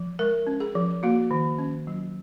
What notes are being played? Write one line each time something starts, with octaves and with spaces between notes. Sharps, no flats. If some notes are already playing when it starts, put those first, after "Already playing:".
Already playing: F3
G#3 A#4
C#4
G#4
F3
A#3 F#4
D#3
C#4
F#3